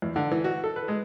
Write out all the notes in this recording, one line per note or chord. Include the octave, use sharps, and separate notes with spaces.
E2
D3
E3
F#4
A4
B4
G#3